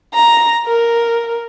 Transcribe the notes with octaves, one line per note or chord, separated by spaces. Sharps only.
A#5
A#4